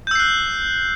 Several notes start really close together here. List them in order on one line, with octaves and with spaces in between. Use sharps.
G6 E6 C7 F#6